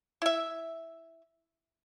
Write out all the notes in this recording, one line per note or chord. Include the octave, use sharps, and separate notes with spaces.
E4 E5